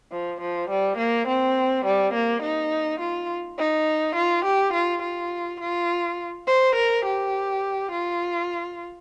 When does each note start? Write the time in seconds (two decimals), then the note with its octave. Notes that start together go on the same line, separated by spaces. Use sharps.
0.12 F3
0.41 F3
0.70 G3
0.98 A#3
1.28 C4
1.85 G3
2.14 A#3
2.43 D#4
3.00 F4
3.59 D#4
4.16 F4
4.45 G4
4.73 F4
5.02 F4
5.60 F4
6.47 C5
6.76 A#4
7.05 G4
7.92 F4